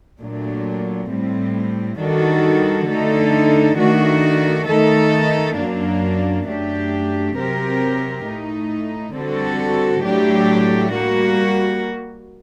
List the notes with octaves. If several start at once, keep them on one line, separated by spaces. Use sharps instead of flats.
A#2 F#3 A3 D4
A2 G3 C4
D#3 G3 D4 F#4 A4
D3 A3 D#4 A4
D#3 A3 D4 F#4
D#3 A3 D#4 A4
F#2 F#3 A#3 D4
F#2 F#3 A3 D4 G4
C3 F#3 C4 G4 A#4
A2 A3 D#4
D3 G3 C4 F#4 A4
A2 F#3 A3 D4 G4
G3 A#3 F#4